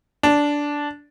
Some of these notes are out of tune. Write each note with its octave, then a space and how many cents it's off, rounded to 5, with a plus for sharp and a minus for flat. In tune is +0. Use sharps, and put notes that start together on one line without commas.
D4 -10